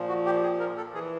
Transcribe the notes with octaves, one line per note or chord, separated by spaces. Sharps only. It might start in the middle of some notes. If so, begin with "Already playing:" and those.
Already playing: A#2 F3
F#4
G4
G#4
A#4
A4
E3 G#4